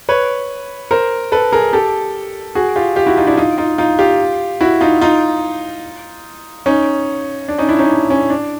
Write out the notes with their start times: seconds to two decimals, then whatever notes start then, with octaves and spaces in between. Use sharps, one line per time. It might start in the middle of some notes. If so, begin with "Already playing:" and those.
0.09 B4 C#5
0.91 A#4 C5
1.32 A4 B4
1.53 G#4 A#4
1.73 G4 A4
2.55 F#4 G#4
2.76 F4 G4
2.96 F4 G4
3.06 E4 F#4
3.17 D#4 F4
3.27 D4 E4
3.37 D#4 F4
3.58 D#4 F4
3.78 D#4 F4
3.99 F4 G4
4.61 E4 F#4
4.81 D#4 F4
5.01 D#4 F4
6.66 C#4 D#4
7.48 D4
7.58 C#4 D#4
7.69 D4 E4
7.79 C#4 D#4
7.89 D4
8.10 C#4
8.30 D4